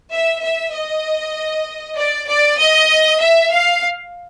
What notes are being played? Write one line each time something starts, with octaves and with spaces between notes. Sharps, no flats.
E5
E5
D#5
D5
D5
D#5
E5
F5